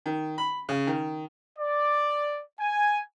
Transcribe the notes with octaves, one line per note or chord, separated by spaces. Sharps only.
D#3
B5
C#3
D#3
D5
G#5